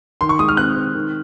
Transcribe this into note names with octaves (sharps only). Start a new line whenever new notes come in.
D#3 C6
C#6
G#3 D#6
F6
C4 F#6
C4
D#3